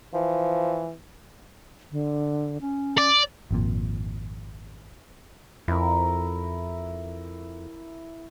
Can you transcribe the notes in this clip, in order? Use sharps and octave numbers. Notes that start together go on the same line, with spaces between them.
E3 F3
D3
C#4
D5
G#1 F2 A#2
F2 E4 A#4